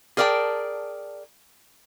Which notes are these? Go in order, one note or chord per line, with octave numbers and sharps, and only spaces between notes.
G#4 A#4 D5 E5 G5 A5